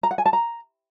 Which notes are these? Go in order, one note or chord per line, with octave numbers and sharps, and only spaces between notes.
A#5
F#5
G#5
A5
A#5